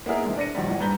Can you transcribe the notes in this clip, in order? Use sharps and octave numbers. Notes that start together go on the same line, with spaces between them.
A#3 B3 D#4 E4 G#4 A#4
C3 E3 G#3 D4
D4 D5 A#6 C#7 D#7
A#1 A#2 D#3 F#3 G3
G#1 A#2 E3 F#5
G2 B4 A#5 G6 G7